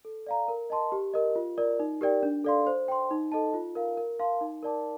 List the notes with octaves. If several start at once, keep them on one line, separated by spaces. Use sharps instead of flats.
A4
D5 F5 A#5
A#4
D#5 A5 C6
G4
A#4 D#5
F4
A#4 D5
D#4
G4 A#4 D5 G5
D4
A4 D5 F5 C6
C5
G5 C6
D#4
A4 D#5 A5
F4
A#4 F5
A#4
F5 A5 C6
D#4
A#4 D5 A5 D6